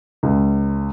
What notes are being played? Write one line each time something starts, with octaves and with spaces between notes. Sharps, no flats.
C#2